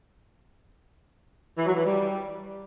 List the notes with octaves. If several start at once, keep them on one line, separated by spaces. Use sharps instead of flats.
E3
F#3
E3
G3